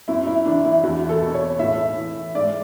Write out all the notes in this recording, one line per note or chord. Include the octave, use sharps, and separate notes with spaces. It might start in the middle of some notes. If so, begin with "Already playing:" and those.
F#2 E4
E4
E3 D4
E4
E2 F#4
A4
B2
C#5
A2 E5
E3
G#2 D5